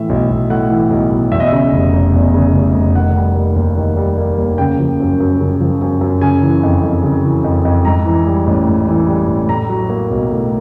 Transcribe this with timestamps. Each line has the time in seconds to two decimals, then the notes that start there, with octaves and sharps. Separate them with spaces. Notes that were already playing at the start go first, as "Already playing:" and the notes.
Already playing: A2 E3 E5
0.09 B1
0.30 B1
0.50 A2 F#5
0.70 E3
0.90 B1
1.11 B1
1.32 E2 E5
1.40 D#5
1.48 C#3 E5
1.72 F1
1.93 F1
2.14 E2
2.34 C#3
2.55 F1
2.74 F1
2.95 D#3 F#5
3.16 G3
3.36 A#3
3.56 D#2
3.77 D#3
3.97 G3
4.18 A#3
4.38 D#2
4.58 C#3 G5
4.80 F3
5.00 F#2
5.20 F#2
5.40 C#3
5.61 F3
5.82 F#2
6.01 F#2
6.21 C#3 G#5
6.42 E3
6.63 F2
6.83 F2
7.04 C#3
7.24 E3
7.44 F2
7.65 F2
7.85 G#2 A#5
8.06 E3
8.27 G3
8.47 A1
8.67 G#2
8.88 E3
9.08 G3
9.28 A1
9.49 A2 A#5
9.69 F#3
9.90 A#3
10.11 B1
10.31 A2